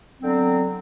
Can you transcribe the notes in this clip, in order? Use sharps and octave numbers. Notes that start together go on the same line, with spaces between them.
D3 F#3 B3 C4